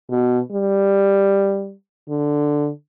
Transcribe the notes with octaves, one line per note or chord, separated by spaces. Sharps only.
B2
G3
D3